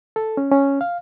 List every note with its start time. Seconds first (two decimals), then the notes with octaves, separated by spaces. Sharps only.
0.16 A4
0.37 C#4
0.51 C#4
0.81 F5